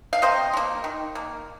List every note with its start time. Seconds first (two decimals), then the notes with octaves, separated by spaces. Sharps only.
0.13 F5
0.22 C3 C5 D#5
0.53 F3 A#3
0.84 D#3
1.15 A#3